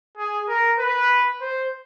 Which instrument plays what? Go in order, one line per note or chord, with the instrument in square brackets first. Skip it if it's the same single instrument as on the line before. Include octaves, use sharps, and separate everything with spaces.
[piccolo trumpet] G#4
A#4
B4
C5